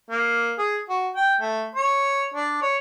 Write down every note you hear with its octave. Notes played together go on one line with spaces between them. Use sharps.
A#3
G#4
F#4
G5
A3
C#5
D4
C#5